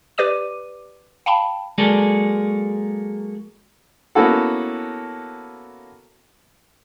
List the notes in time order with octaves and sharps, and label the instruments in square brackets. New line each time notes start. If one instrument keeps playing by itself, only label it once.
[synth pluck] G4 B4 D5 D6 D#7
F5 G5 A5 B5
[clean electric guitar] F#3 G#3 A#3 G#4 A4 D5
[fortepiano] A#3 B3 C#4 E4 F#4 A4